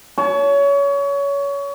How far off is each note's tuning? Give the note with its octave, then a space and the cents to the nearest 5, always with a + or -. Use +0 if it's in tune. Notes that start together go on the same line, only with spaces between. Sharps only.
C#5 +25 A5 -25